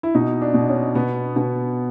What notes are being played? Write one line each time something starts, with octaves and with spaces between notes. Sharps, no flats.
E4
B2 D#4
D4
B2
C#4
B2 B3
B2 B3